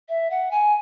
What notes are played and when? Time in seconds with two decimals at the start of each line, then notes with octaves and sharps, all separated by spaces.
0.09 E5
0.30 F#5
0.51 G#5